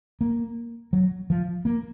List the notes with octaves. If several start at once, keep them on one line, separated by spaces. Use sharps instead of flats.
A#3
F#3
F3
A#3